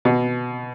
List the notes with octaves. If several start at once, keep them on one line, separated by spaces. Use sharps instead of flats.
B2